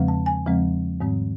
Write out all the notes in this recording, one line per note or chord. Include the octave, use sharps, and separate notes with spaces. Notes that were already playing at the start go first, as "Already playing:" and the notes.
Already playing: E2 C#3 F3 G#3 C4
A5
G#5
E2 C#3 F3 G#3 C4
G#2 D#3 G3 C4